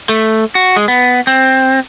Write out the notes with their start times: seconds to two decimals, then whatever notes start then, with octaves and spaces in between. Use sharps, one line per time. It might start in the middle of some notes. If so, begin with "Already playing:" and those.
0.09 A3
0.55 F#4
0.76 G#3
0.88 B3
1.27 C4